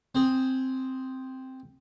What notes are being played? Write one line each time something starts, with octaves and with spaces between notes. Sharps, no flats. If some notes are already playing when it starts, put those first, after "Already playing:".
C4 G#4